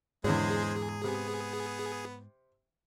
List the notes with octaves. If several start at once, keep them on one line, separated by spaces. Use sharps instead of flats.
E2 G#2 D3 G#3 G#4 C5 C#5
C3 B3